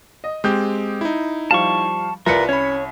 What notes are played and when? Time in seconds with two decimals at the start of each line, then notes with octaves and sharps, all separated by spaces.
0.24 D#5
0.44 G#3 C4 G4 D#6 G6
1.01 D#4 E4
1.51 F3 G3 F5 A5 C#6
2.26 C2 F4 A#4 B4 D5 B6 C#7
2.49 C#4 C#5 B5